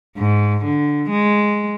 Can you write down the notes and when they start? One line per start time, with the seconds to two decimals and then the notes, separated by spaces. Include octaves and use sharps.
0.17 G#2
0.64 D3
1.10 G#3